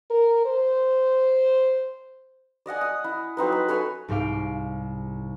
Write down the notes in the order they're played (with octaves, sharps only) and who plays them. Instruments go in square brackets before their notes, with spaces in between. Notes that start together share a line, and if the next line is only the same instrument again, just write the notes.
[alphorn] A#4
C5
[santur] D5 D#5 F#5 G#5
D#6
E4
F#3 C4 D#4 B4
B4
A4 B4 C#5 G#5
[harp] C2 G#2 G4 F5 D7